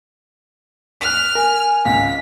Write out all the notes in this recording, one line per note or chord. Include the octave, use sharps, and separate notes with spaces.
F6 F#6 B6
A#4 G#5
G#1 C#2 B6